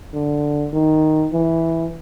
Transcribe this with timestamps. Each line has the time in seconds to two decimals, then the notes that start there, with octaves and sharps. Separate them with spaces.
0.13 D3
0.73 D#3
1.33 E3